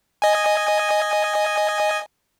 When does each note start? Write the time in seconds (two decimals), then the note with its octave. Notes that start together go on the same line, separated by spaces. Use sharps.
0.22 D#5 G#5